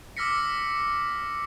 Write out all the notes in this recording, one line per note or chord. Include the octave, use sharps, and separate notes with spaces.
D6 E6 F6 A#6 B6 C#7